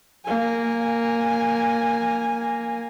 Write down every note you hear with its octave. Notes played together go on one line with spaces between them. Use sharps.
A#3 G#5